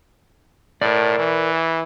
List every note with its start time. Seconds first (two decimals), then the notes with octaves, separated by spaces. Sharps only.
0.82 A2 A#4 D5
1.19 E3